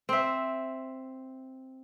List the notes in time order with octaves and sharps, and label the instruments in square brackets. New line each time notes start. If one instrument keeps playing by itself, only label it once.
[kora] C4 E5